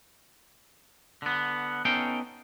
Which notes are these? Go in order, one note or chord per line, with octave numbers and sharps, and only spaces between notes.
D3 B3
B3 C#4 D#4 A4 F5 G5